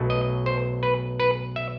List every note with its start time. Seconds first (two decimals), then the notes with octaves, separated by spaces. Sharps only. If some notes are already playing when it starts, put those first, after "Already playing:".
Already playing: B1 B2 F#3 A3
0.10 D#5
0.46 C5
0.83 B4
1.20 B4
1.56 E5